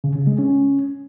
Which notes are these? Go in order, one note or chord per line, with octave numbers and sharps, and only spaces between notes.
C#3
C#3
G#3
C#4